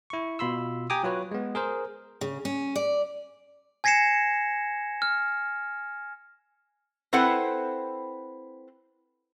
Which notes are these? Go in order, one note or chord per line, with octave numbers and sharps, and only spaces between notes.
E4 C#6
B2 F4 B5 C6 E6
G4 G5 G#5 A#5 D6 D#6
F#3 F4 B4 C#5
G#3 B3
G#4 A#4 C5
C#3
C#4
D5
G#5 G#6 A#6 C7 C#7 E7
F6
C4 E4 A4 B4 C5 F#5